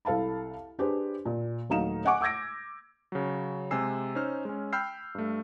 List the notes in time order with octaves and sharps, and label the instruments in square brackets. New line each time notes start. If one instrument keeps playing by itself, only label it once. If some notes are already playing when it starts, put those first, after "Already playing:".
[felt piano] C2 A4 F5 A5 B5
D4 G4 G#4 B4 C5
A#2
D#1 F#3 A3 D#4 F5 E7
D#5 F#5 G#5 C#6 D6
D6 E6 G6 G#6 A#6 D7
[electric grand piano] C#3 F#3
C3 G#3 G4 G#5 E6 C7
C#4 D#4 C5 F6
G#3 C#4
G5 B5 E6 F6 G6 C7
G2 A3